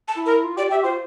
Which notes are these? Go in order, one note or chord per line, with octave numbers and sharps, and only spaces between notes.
A5
E4
A#4
F4
G4 D5
G4 E5
F4 C5